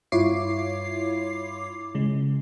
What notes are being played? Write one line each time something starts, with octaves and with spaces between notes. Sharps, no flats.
G2 E4 F4 C#5 D6 C7
C#3 G#3